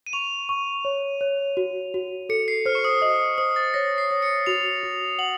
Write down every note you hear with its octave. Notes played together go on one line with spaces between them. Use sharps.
D#7
C#6 F7
C#6
C#5
C#5
F#4
F#4
A4 C#7
C7
C5 F6
C#6
D#6
D#5 D#6
C5 D#6
A6
C#5 A#6
C7
C#5
C#7
F#4 F7
F#4
F#5 F#7